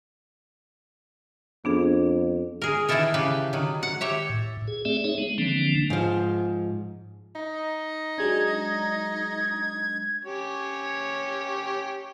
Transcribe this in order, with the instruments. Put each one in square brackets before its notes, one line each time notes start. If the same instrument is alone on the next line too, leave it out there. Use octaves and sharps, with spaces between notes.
[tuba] F2 [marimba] B3 D4 G#4
[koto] G#4 A#4
D#3 E3 B3 E4 A4 A#4
C#3 G4 B4
D#3 F#3
F#5
G4 C#5 E5
[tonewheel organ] A2
G#4
A3 C4 G#4 D5 E5
D#4 G#4 C#5 E5
G#3 B3
D3 E3 F3 A#3 C4 D4
[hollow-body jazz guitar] G#2 F3
[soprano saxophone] D#4
[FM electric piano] F#3 G#3 D4 [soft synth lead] G#6
[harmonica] C#4 G4 C#5